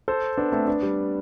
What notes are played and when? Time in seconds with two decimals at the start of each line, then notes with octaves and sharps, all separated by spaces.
0.08 A4 C5
0.37 B3 D4
0.52 A3 C4
0.67 B3 D4
0.83 G3 B3